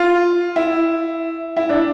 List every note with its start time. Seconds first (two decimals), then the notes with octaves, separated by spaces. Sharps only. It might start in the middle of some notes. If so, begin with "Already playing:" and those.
Already playing: F4
0.56 E4
1.56 E4
1.69 D4